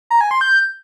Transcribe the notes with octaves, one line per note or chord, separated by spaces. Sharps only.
A#5
G#5
C6
G6